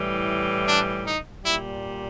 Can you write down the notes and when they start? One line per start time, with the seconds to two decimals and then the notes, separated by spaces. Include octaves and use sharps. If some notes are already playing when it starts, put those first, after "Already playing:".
Already playing: A2 E3 G3
0.68 D4
1.06 D#4
1.43 A#2 G3 E4